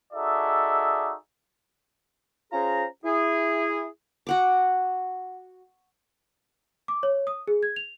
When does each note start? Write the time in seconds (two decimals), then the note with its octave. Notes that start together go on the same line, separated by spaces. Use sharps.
0.13 D#4 F#4 G#4 A4 D5 E5
2.52 C#4 F4 G#4 C5 A#5
3.05 E4 G#4
4.27 F#4 F#5 D6
6.88 D6
7.03 C#5
7.27 D#6
7.47 G#4
7.63 G#6
7.76 F7